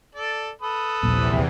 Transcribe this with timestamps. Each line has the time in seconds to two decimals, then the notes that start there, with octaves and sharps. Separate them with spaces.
0.15 A4 D5
0.62 A4 B4 D#6
1.03 D#1 A#1 E2 C3 E3